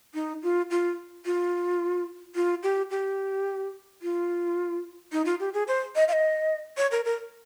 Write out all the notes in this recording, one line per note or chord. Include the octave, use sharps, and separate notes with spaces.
D#4
F4
F4
F4
F4
G4
G4
F4
D#4
F4
G4
G#4
C5
D#5
F5
D#5
C#5
A#4
A#4